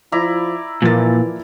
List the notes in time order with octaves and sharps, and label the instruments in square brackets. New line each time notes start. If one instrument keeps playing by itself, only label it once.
[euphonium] F3 [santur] E4 D5 A#5
[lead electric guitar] A#2 [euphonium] E3 [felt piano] F3 A#3 A6